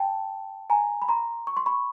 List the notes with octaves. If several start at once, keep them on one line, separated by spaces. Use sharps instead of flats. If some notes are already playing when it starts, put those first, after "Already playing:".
Already playing: G5 A5
G#5 A#5
B5
A#5 C6
C#6
C6
B5 C#6